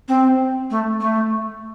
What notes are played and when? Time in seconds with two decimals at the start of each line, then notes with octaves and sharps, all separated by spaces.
0.08 C4
0.70 A3
1.01 A3